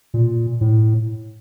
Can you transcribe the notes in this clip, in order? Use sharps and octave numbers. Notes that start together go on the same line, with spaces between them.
A#2
A2